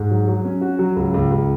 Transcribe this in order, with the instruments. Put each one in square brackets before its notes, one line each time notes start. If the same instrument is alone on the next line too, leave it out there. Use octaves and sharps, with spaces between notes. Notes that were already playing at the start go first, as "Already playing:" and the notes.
Already playing: [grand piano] G#2
F#3
F#3
C#4
F#4
F#3
C#2
C#2
C#2